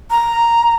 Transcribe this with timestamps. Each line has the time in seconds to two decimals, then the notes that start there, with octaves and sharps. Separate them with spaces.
0.11 A#5